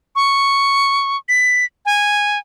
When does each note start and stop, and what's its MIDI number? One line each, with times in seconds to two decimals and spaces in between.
0.16 1.17 85
1.29 1.65 95
1.86 2.38 80